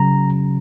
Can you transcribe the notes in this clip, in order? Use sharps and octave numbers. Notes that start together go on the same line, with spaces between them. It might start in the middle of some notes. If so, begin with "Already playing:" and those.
Already playing: C#3 F#3 A#5